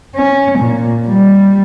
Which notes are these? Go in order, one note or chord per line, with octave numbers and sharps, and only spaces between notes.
C#4
A#2
G3